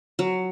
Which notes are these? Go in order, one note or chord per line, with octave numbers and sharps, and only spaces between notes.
F#3